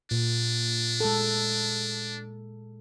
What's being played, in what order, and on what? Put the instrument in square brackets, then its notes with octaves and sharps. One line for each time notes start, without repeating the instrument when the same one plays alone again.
[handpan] A#2 [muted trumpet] D4
[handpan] G#3 A4